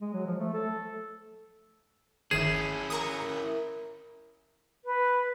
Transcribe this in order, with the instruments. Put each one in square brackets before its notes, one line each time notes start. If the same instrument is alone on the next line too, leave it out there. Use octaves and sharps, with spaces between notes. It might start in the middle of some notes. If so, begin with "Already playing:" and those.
[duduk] G#3
F#3
F3
A3
A4
[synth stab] G1 D#3 E7 [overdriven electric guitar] C#4 E4 [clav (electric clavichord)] G#4
[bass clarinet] A#4 [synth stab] A#5 C#6 D#6
[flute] B4